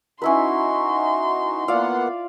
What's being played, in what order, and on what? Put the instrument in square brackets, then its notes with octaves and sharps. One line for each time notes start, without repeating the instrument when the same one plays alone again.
[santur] C#4 E4 B4 [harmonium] D#4 F#4 [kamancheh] C6
[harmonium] A#3 B3 F#5 [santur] F4 D5 F5